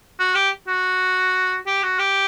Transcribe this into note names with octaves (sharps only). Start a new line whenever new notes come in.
F#4
G4
F#4
G4
F#4
G4